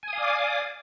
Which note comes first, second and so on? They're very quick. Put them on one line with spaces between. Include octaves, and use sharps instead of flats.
G#5 D#6 F5 D5 D6